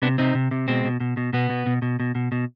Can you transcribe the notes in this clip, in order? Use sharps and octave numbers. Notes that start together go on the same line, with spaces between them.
C3 B3 D4
C3 C4 D#4
C3
C3
B2 G#3 C4
B2
B2
B2
B2 B3
B2
B2
B2
B2
B2
B2